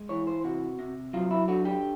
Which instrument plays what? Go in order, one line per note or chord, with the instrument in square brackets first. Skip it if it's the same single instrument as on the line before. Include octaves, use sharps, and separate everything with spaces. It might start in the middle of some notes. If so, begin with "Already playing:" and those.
Already playing: [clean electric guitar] G#3
E3 C#5
C5
C3 F#4
C3
F#3 F4
E4
D3 F#4
G4